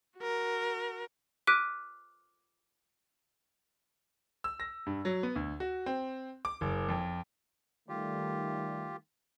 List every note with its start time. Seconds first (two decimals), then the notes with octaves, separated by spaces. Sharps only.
0.18 F#4 A#4
1.47 D6 F6 F#6 B6 D7 D#7
4.44 E6
4.60 A#6
4.86 G2
5.05 F#3
5.23 B3
5.36 D2
5.60 F#4
5.86 C4
6.45 D6
6.61 F#1
6.89 F2
7.89 D#3 G3 A3 F4 G4